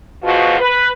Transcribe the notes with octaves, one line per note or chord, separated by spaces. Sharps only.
E2 B2 F3 F4 F#4
B4